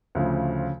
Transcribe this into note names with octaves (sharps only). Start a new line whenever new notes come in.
D2 C#3 F3